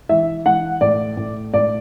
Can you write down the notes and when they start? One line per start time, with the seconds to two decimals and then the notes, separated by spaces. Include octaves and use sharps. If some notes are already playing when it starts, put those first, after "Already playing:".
0.09 E3 E5
0.46 E3 F#5
0.81 A2 D5
1.17 A2
1.54 A2 D5